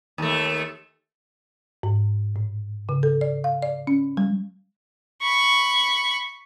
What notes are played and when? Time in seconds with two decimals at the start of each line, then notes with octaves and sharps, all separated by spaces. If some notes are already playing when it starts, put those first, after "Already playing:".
0.18 D#2 A3
1.83 G#2
2.36 A2
2.89 C#3
3.03 A4
3.21 D5
3.44 F5
3.62 D5
3.87 C#4
4.17 G3
5.23 B5 C#6